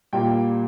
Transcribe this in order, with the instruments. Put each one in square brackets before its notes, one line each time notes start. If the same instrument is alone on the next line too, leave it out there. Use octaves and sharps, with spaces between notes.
[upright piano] A#2 G3 A#3 G5